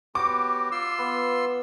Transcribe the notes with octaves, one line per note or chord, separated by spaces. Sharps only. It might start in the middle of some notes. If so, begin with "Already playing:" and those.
B3 F#4 G4 C#5 D6
F4 C6 E6
B3